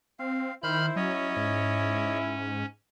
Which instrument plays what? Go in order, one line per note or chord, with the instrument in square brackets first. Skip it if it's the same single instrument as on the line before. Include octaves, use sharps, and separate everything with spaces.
[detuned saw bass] C4 [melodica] F5
[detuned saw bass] D#3 [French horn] E4 [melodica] C5 [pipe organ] B5 F6 G6
[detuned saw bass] F#3 [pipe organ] C#4 [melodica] C#5 D#5
[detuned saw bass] G#2